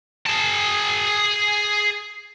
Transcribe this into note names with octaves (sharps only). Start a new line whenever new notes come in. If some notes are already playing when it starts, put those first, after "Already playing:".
G#4 A5